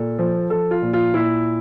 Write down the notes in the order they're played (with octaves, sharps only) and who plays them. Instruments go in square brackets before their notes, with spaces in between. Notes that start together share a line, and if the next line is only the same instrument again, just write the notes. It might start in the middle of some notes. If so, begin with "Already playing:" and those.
Already playing: [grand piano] A#2 A4
F3
F3 A4
F4
A#2
F4
A#2 E4